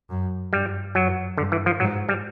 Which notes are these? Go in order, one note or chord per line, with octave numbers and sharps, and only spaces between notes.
F#2
G2 G3
F#2 F#3
G2 D3
E3
F3
G#2 F#3
G3